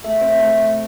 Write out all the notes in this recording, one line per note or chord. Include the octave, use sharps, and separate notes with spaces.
A3 E5
C4
E5
A3